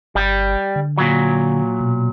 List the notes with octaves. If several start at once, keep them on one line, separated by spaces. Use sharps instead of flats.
G1 G3
D3
A#2 F#3
B2